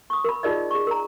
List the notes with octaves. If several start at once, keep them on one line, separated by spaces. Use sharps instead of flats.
C#6 D#6
A#4 B5
D#4 F4 G#4 A#4 D5 D#5
G#4 C#6
A#4 A#5